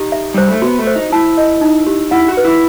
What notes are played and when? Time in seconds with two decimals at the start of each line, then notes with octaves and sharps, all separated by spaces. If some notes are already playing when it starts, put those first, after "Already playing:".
Already playing: D#4 G4
0.12 E5
0.34 G3 C5
0.48 A3
0.62 B3 F#4
0.79 A3
0.87 C5
0.96 D#4
1.12 E4 A5
1.37 D#5
1.61 D#4
1.87 G4
2.11 E4 F#5
2.28 F#4
2.37 B4
2.45 E4